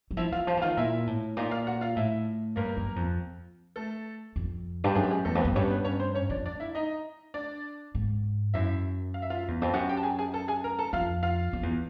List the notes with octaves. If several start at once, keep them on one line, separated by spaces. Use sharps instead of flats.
F#3
F3 E4 E5
E3 F4 F5
F3
E3
D#3 F4 F5
A#2 E4 E5
A2
A#2 D#4 D#5
F4 F5
F#4 F#5
F4 F5
A2 E4 E5
G2 A#3 A#4
F#2
F2
A3 A4
F2
G2
F#2 G#3 G#4
G4
G#3 G#4
E2 A3 A4
F2
B3 B4
F#2
G2 C#4 C#5
B3 B4
C#4 C#5
C4 C5
C#4 C#5
F2 D4 D5
D4 D5
E4 E5
D#4 D#5
D4 D5
G#2
F#2 E4 E5
F5
E5
F4 F5
E2
F2
F#2 F#4 F#5
G4 G5
A5
G#4 G#5
G#4 G#5
A4 A5
G#4 G#5
A#4 A#5
A4 A5
F2 F4 F5
F4 F5
F2
E2